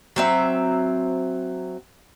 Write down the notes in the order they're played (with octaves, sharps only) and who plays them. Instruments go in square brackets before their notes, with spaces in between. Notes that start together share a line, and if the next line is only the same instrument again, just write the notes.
[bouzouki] F#3 C4 E5